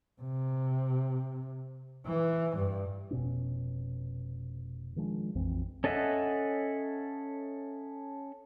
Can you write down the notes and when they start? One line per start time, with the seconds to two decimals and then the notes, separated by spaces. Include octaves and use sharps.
0.21 C3
2.06 E3
2.56 G2
3.10 F1 B2 C#4
4.96 D#3 F3 G#3 D4
5.35 A#1 F2 E3 C4
5.84 C#4 A4 D#5 E5 F#5